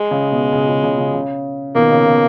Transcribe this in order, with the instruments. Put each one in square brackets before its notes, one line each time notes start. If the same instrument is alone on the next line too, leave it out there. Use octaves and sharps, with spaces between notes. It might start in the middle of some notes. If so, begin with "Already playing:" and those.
Already playing: [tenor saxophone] G#3
[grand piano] C#3
B2
C#3
C#3
C#3
C#3
C#3
[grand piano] B2 D#3 [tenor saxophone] A#3
[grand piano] C#3
B2